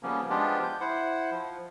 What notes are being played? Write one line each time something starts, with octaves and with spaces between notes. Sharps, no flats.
C#3 F3 G3 A#3 B3 C#4
F3 G#3 B3 D4 F4 G4
G6
E4 C5 F#5
F3